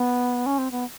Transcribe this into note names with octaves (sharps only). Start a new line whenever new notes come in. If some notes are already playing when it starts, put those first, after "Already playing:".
Already playing: B3
C#4
C4
B3